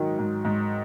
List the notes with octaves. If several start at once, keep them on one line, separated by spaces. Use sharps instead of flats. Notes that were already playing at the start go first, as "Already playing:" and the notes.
Already playing: G#2 D#3 F#3
G#2
G#2